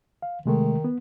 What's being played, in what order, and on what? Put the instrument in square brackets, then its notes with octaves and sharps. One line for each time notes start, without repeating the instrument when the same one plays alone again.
[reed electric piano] F5
[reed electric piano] C3 G#3 A3 [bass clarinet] D#3
[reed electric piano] B3